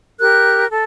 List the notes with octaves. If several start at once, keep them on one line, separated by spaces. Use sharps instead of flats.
G4 A#4 F#6
A4